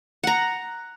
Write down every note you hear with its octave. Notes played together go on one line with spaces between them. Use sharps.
F#5 A#5